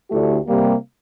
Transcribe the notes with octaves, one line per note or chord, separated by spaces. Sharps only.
D2 D3 A3 E4 G4
C3 G3 A#3